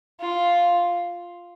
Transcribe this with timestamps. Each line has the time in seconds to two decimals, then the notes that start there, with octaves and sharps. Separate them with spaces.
0.21 F4